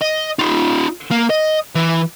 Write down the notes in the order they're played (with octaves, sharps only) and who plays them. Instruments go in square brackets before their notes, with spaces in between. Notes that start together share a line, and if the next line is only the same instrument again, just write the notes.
[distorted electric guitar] D#5
D#4 F4
A#3
D#5
E3